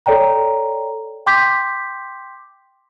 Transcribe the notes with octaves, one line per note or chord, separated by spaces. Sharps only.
A4 C#5 D5 G5 A#5
G5 C6 D6 G6 B6